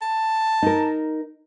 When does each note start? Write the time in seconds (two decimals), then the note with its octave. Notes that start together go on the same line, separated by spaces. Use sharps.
0.02 A5
0.63 D#4 A#4